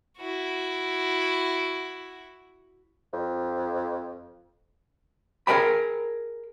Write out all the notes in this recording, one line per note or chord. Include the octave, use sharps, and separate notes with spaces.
E4 F#4
F2
G#4 A#4 B4 D5 G5 B5